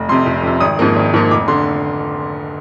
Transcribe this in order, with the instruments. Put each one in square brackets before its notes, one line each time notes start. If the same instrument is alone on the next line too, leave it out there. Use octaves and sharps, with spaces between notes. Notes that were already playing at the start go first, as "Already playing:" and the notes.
Already playing: [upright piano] F1
F2 C3 C6
F1
F2 C3
G#1 D#6
G#2 F3 A#3
G#1
G#2 F3 A#3
F1 D6
D3 C6